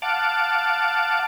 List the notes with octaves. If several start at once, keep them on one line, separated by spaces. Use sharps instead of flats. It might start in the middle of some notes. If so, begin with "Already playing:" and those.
F5 F#5 A5 D6